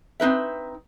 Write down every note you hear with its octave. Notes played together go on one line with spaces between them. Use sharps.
C4 D#4 B4 E5